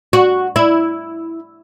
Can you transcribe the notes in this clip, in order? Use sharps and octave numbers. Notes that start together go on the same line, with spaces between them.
F#4
E4